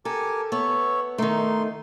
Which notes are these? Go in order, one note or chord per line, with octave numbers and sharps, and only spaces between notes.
G4 A4 A#4 G#5
B3 C#5 E5
D#3 A3 D#4 C6